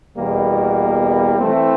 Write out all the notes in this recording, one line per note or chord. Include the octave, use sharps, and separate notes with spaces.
E2 B2 G3 A#3
E3 A3 C4